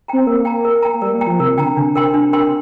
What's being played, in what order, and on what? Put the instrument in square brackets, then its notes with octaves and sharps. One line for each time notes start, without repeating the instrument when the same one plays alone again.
[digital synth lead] C4 [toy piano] G5 A#5
[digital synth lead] A#3 [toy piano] A#4
[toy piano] G5 A#5
A#4
G5 A#5
[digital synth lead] A#3
[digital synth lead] G3 [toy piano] A#4
[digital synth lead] A#3
[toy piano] G5 A#5
[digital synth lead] F3
[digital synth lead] C3 [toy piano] A#4
[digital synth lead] D3 [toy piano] G5 A#5
[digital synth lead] C3 [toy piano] D4
[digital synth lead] C3 [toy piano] A#4 G5 C6
[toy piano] D4
A#4 G5 C6
[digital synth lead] C3